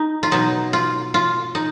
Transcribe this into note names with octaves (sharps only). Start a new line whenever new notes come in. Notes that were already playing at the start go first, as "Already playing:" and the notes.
Already playing: D#4
F4
B2 F#3 D#4
F4
F4
D#4